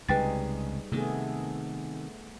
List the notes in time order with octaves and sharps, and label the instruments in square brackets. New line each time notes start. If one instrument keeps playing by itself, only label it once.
[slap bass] C#2 C3 [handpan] G3 D#4 G#4 [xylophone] B4 G5 A6
[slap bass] C3 D#3 [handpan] A3 B3 G#4